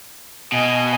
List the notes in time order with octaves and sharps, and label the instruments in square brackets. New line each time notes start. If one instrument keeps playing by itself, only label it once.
[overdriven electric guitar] B2 [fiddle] D#5 G#5